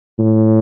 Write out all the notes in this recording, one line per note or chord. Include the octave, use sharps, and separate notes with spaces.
A2